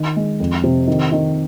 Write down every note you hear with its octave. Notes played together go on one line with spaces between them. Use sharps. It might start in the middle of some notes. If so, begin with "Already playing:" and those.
Already playing: D#3
G#3
F2
C3
D#3
D#3